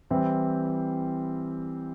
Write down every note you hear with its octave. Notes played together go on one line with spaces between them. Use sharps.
E3 G3 C4 E4 G4